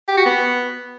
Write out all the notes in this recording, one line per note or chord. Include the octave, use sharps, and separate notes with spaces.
G4
F#4
B3